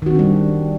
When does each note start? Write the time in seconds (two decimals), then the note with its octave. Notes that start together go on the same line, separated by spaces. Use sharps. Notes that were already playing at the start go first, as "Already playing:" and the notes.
0.02 D#3
0.06 F#4
0.11 C4
0.15 D4
0.19 G3